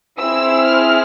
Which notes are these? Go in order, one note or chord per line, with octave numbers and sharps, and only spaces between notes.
C4 E4 G#4 E6
F6